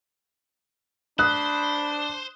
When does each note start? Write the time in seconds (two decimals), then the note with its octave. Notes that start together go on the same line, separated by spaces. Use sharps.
1.19 D4 C5 B5 D#6 F#6